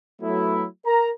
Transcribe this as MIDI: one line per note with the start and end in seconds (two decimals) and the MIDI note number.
0.21 0.65 54
0.21 0.65 57
0.21 0.65 59
0.21 0.65 64
0.86 1.10 70
0.86 1.10 82